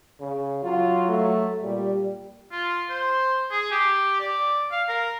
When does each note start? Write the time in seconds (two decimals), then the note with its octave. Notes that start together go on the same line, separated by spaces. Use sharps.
0.20 C#3
0.64 F#3 F4
1.08 A3
1.63 A#2 G3
2.52 F4
2.90 C5
3.51 G#4
3.71 G4
4.20 D5
4.72 F5
4.89 A#4